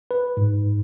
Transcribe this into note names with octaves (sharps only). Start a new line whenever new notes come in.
B4
G#2